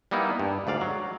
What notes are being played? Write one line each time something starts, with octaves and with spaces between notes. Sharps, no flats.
G3 A#3 B3 D#4 E4
G2
D2 G#2 D5 F5
F#3